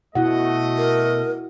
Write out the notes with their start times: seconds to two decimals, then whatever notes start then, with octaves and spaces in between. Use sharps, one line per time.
0.15 B2 A3 E4 F#4 D#5 F#5
0.77 A#4